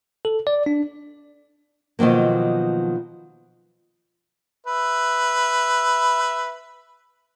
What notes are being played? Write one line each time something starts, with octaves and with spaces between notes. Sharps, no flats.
A4
D5
D4
B2 D#3 F3 F#3 A#3
B4 E5